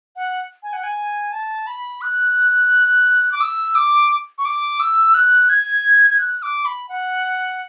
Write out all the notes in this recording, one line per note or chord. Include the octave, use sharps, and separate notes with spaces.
F#5
G#5
F#5
G#5
A5
B5
F#6
D6
E6
D6
C#6
D6
E6
F#6
G#6
G#6
F#6
D6
B5
F#5